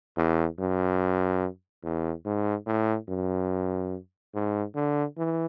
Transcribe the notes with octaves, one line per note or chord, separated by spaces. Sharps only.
E2
F#2
E2
G#2
A2
F#2
G#2
D3
E3